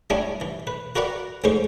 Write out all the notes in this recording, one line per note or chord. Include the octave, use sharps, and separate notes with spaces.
G3 C#4 D4 E4 G#5
E3
B4
F#4 A#4 B4 D5 F#5 A#5
F2 G#2 C#4 C5 C#6